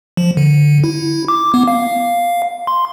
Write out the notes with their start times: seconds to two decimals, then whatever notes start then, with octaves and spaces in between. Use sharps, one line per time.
0.17 F3
0.37 D3
0.84 E4
1.28 D6
1.54 B3
1.68 F5
2.67 C6